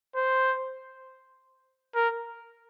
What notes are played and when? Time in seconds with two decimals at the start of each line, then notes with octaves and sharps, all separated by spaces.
0.16 C5
1.95 A#4